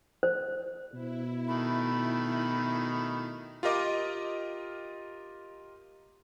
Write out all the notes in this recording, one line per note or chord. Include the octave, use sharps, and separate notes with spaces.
C5
B2 E4
D#3 A3 B5
F4 G4 A#4 D#5 D6